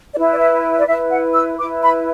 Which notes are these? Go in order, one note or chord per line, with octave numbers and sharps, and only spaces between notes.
E4 B4 D5
D5
E5
D5
E4 B4 E5
F#5
E6
E4 B4 D6
B5